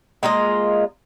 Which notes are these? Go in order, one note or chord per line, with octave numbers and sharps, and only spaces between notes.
G#3 A#3 F4 D#5